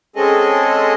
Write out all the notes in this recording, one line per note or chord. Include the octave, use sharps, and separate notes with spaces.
G#3 C4 C#4 G#4 A4 D#5